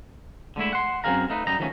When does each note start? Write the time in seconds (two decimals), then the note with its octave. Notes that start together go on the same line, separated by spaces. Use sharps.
0.56 D3 G#3 A3 E4
0.73 F#5 C6
1.04 F#2 C4 G#4 A#4 F5 A#5
1.30 A3 D#4 B4
1.47 F#2 G3 D#4 A#5
1.59 D#3 F3 F#3 A3 A#3 C#4